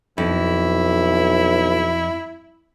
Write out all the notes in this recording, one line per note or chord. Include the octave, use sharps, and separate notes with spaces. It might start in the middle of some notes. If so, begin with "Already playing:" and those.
B1 F2 E4